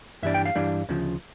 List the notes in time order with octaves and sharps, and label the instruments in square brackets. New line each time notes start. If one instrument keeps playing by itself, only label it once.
[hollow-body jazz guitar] G2 E3 G3 D4 E5
G5
F5
G2 E3 G3 D4
D2 C#3 F3